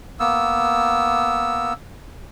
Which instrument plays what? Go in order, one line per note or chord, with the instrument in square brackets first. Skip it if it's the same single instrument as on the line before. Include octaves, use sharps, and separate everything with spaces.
[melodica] A#3 B3 E6